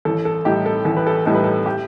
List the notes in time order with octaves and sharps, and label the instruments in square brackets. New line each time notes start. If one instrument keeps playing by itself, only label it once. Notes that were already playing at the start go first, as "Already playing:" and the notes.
[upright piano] A1 A4
A4
A2 G3 D#4 G4
A4
A1 A4
B4
A4
A2 G3 D#4 A4
B4
A4
G4